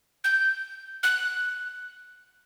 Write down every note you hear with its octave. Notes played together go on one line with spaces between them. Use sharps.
G6
F#6